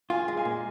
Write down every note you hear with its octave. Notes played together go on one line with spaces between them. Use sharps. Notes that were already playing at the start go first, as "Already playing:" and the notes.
F4 F5 G#5
G#3
F5 G#5
A#2